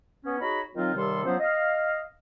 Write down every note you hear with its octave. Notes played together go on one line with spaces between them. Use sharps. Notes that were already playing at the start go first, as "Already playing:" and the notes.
B3 C#4
D#4 F#4 G#4 C#5 A#5 B5
D#3 F#3 C4 D#4 F4
D#2 C3 D#3 G3 A4 C6
F3 F#3 B3 C#4 C5
D#5 F5